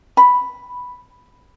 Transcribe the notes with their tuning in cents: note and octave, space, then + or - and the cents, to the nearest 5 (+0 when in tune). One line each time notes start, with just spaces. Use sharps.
B5 +0